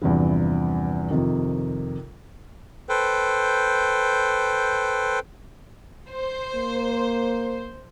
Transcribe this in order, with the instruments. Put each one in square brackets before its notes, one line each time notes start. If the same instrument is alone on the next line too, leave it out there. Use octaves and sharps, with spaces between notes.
[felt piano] E2 G2 C3 E3 F3
F2 C3 D#3
[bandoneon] A4 B4 C5 G5
[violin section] C5
[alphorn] A#3